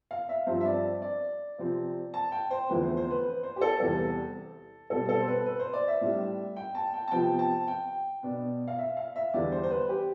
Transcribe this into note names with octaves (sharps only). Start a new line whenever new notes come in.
F5
E5
G2 F3 C4 C5
E5
D5
D5
C3 F3 C4
A5
G5
C5
E2 D3 F3 A3 C4 B4
C5
C5
B4
B4
C5
G4
A4
E2 C3 G3 A4
B2 G3 C4 A4
A4
C5
B4
B4
C5
D5
E5
A2 G3 D4
G5
A5
G5
A5
C3 F3 B3 G5
A5
G5
B2 B3 D4
F5
E5
F5
E5
E2 D3 G3 B3 D4 D5
C5
C5
B4
G4